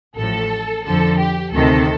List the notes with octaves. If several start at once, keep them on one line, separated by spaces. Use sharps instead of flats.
A1 A2 F3 A4
F2 D3 F3 A4
G4
D2 C3 D#3 A4